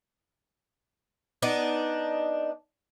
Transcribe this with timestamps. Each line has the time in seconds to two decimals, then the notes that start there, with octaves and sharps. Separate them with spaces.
1.42 B3 D4 D#4